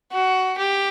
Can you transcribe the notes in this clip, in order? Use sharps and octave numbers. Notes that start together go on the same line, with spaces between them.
F#4
G4